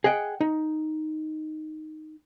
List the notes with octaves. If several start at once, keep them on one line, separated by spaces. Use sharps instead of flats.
G#4 D#5 F#5 G5
D#4